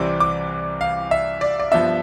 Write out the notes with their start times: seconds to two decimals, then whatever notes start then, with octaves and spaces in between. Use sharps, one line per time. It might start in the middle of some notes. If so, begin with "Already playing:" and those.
Already playing: C2 C3 E3 G3 C4 D6
0.20 D6
0.81 F5
1.11 E5
1.41 D5
1.59 D5
1.71 G2 F3 B3 D4 E5